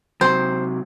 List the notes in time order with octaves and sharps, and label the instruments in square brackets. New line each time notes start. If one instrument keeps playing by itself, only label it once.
[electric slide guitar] C3 F#3 [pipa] C5